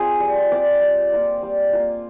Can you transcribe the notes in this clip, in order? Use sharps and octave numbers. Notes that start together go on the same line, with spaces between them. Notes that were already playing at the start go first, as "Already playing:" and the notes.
Already playing: C4 F4 G#4 C5
G3
C4 F4 D5
G3
A#3 F4
G3
A#3 F4